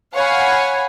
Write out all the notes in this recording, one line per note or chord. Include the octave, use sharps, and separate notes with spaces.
C#5 F5 F#5 G#5 B5